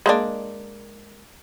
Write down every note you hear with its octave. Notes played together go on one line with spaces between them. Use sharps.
G#3 A#3 D4